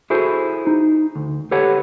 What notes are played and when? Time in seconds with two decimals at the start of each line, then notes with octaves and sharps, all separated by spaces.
0.10 E4 F#4 G#4 A4 C5
0.67 D#4
1.15 D2
1.51 G4 A4 B4 C#5 F#5